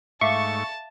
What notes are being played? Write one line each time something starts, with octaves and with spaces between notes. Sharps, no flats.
G#2 A3 E5 F5 A5 C#6 D6